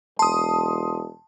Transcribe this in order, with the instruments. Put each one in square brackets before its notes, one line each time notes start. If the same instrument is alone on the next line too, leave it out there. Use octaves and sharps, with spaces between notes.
[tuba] E1 [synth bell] A5 [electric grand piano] C6 D#6